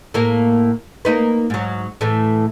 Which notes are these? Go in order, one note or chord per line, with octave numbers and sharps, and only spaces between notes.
A2 A#3
A#3 D#4 B4
G#2 F#3
A2 E3 A3